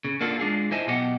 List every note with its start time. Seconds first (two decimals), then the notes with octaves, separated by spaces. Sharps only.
0.05 C#3
0.21 A#3 D4 F4 F#4 A4
0.39 G#3 D4 F4 G#4
0.71 E4 C5 D#5 E5 G#5 A5
0.86 B1 B2 F4 G4 D#5 F#5